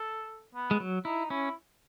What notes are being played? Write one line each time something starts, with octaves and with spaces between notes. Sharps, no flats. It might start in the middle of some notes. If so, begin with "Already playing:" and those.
Already playing: A4
B3
G#3
F#3
D#4 E4
C#4 E4